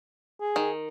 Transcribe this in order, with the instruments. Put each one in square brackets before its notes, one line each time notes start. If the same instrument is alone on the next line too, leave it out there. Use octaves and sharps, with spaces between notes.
[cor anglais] G#4
[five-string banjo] D#3